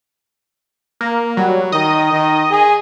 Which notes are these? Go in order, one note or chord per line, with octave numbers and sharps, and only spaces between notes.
A#3
F#3 G3
D#3 D#5
D#3
G#4